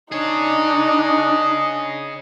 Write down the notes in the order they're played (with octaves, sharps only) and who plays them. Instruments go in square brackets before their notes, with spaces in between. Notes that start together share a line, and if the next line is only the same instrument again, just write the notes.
[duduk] D4 [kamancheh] D#4 [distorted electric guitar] G#4 C#5 [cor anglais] D#5